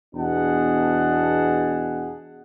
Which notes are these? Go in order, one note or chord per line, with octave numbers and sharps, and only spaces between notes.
E2 B2 D4 G#4 F#5 A5